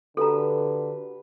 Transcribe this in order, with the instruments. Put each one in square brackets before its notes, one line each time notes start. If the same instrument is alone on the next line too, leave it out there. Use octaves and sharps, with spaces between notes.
[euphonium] D3 [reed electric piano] F#4 G4 [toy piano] A4 A#5 [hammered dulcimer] B4 D6